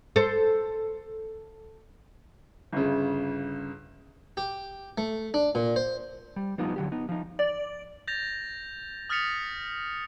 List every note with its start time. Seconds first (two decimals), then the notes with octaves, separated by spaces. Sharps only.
0.16 A4 C5
2.72 G1 C#3
4.37 G4
4.98 A3
5.34 D4
5.55 A#2
5.76 C5
6.36 G3
6.58 F3 G3 B3 D4 D#4 F4
6.76 D3 F#3 G4
6.92 B3 D#4
7.09 F3 D#4
7.39 D5
8.08 G6 A6 A#6 F7
9.10 D#6 F6 A6 B6 C#7 F7